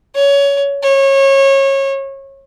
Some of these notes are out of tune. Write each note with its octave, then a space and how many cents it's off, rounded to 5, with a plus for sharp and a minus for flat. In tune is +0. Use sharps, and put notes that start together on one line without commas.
C#5 +20
C#5 -25